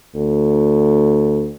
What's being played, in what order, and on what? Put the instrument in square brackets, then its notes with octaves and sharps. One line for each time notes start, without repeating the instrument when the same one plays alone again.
[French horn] D2